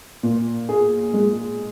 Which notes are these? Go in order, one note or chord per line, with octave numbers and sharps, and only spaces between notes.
A#2
G#4
G#3